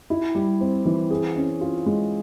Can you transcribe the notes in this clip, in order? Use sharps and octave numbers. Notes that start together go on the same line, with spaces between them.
E4
G3
C4
E3
G#4
C#4
F4
G#3